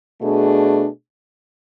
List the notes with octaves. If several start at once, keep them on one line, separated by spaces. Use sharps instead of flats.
B2 A3 D4 G#4